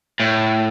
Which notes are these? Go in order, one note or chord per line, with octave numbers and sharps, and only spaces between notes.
A2